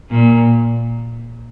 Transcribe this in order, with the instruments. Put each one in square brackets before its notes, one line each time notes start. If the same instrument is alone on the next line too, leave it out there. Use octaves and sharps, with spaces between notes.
[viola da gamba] A#2